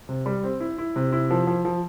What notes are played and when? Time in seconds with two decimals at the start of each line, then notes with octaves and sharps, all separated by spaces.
0.09 C3
0.26 G3
0.44 C4
0.60 E4
0.78 E4
0.96 C3
1.12 E4
1.31 F3
1.47 F3
1.65 F3